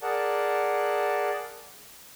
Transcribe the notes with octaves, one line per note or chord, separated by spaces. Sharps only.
G#4 A#4 D5 F#5 A5